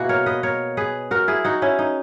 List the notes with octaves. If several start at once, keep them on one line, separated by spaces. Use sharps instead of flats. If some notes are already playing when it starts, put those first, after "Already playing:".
Already playing: B2 A#3 E4 F#4 G#4
A#4 C#5
B4 D#5
A#4 C#5
G#4 B4
F#4 A#4
E4 G#4
D#4 F#4
C#4 E4
D#4